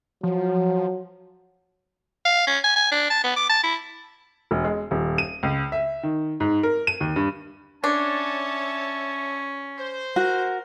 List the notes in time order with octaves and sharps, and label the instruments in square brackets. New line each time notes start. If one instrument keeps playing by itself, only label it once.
[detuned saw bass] F3 [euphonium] F#3
[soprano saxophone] F5
C#4
G#5
G#5
D4
A5
B3
D6
A5
E4
[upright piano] E1
G#3
D#1
D#7
C#2
E5
D#3
G#2
A#4
D#7
D#2
G2
[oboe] C#4 [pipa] D4 [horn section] C#5 E5 A5
[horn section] C5
[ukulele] F#4 [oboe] A#4